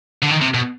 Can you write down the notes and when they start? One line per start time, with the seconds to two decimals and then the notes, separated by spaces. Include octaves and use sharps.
0.22 D3
0.30 D#3
0.41 C3
0.54 B2